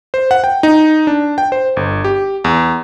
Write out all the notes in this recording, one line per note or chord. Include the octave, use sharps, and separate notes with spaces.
C5
F#5
G5
D#4
D4
G5
C5
G1
G4
E2